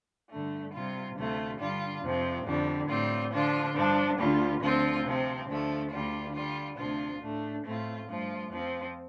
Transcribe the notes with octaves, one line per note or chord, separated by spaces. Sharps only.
G2 D3 A3
C3 G3 F4
D2 C3 A3 F4
G2 D3 G3 D4 F4
F2 C3 F3 C4
F2 D3 G3
A2 G3 C4 F4
D3 F3 D4 F4
G2 F3 D4
D2 D3 G3 F4
D2 D3 F3 C4 F4
C3 F3 C4
D2 D3 F3 A3
D2 D3 G3 D4 F4
D3 G3 F4
D2 C3 F3 D4 F4
A2 A3 D4
A2 A3 C4 F4
G2 F3 A3 F4
F2 F3 C4